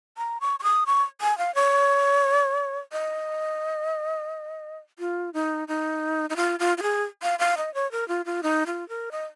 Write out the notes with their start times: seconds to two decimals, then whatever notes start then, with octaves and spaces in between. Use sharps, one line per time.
0.18 A#5
0.41 C#6
0.60 C#6
0.63 D#6
0.87 C#6
1.21 G#5
1.38 F5
1.55 C#5
2.92 D#5
4.99 F4
5.34 D#4
5.68 D#4
6.30 D#4
6.36 F4
6.60 F4
6.78 F4
6.82 G#4
7.22 F5
7.39 F5
7.57 D#5
7.74 C#5
7.92 A#4
8.08 F4
8.26 F4
8.43 D#4
8.66 F4
8.89 A#4
9.12 D#5